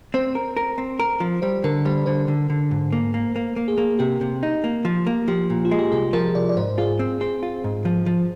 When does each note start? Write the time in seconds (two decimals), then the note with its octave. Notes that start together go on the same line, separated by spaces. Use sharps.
0.14 C4 C5
0.35 A#4
0.57 A#4
0.78 C4
1.00 A#4
1.20 F3
1.42 G3 C5
1.64 D3 A#4
1.85 G3 C5
2.06 D3 C5
2.28 D3
2.50 D3
2.71 G#2
2.92 A#3
3.14 A#3
3.36 A#3
3.56 A#3
3.68 G#4
3.78 A#3
3.99 C3 G4
4.21 C3
4.43 D#4
4.64 A#3
4.85 F3
5.07 A#3
5.28 F3 G4
5.50 A#2
5.65 F4
5.71 G#3
5.79 G4
5.92 C2 G#4
6.13 F3 A#4
6.35 C2 D5
6.49 D5
6.57 G#2 C5
6.78 F4 G#4
6.99 C4
7.21 C4 G#4
7.43 F4
7.64 G#2
7.85 F3
8.06 F3